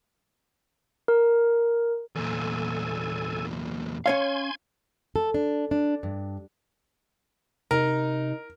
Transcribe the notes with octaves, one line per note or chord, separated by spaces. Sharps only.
A#4
E2 A#2 A4 G#5
C#4 C#5 F5 G#5 C6 G#6
A4
D4
D4
G2
C3 D#4 A#4